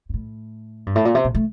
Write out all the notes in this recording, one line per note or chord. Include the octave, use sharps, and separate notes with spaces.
G2
A2
G2
A2
A#2
C3
A#2
A3